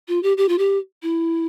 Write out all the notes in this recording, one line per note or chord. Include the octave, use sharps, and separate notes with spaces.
F4
G4
G4
F4
G4
E4